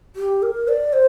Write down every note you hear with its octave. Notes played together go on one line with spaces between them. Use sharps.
G4
A#4
D5
C5